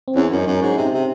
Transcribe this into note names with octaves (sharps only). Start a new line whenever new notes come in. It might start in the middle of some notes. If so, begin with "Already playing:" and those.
C4
E2 C#4
F#2 D#4
F#2
C#4
G#2
C3 D#4
C3